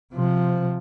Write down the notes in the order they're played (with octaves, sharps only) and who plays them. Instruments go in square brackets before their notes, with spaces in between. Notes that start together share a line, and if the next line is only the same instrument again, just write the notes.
[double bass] C3 F3